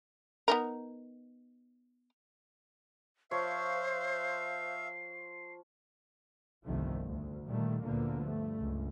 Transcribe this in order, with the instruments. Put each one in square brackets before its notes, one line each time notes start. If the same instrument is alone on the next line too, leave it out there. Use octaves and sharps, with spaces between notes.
[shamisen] B3 D#4 A#4
[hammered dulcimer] F3 F4 C#5 [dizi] C5 [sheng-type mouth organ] E5 F5 [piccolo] C7
[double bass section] G1 C2 D#3 F3 A3
D2
A#2 D#3 G3 A3
D2 A#2 D3 F3 A#3 B3
G2 A3
C#2 G2